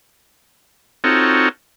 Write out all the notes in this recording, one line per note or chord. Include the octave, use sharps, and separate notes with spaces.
C4 D#4 F4 F#4 A4 C#5